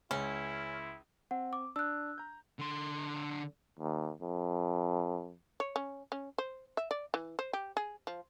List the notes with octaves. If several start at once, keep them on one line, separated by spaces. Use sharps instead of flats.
C#2 C#4 E4
C4 F#5
D6
D4 E6 F#6
A#5 G6
D3 C6
D#2
F2
C#5
C#4
C#4
C5
E5
D5
E3
C5
G4
G#4
F3